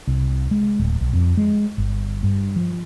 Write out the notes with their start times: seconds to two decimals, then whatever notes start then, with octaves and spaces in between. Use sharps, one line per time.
0.07 C2
0.51 G#3
0.79 D1
1.01 B1
1.13 F2
1.37 G#3
1.78 G1
2.23 G2
2.56 F3